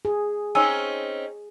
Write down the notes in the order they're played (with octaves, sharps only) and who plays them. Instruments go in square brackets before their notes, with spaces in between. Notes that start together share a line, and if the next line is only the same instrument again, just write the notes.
[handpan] G#4
[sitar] C4 C#4 D#4 [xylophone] G#5 E6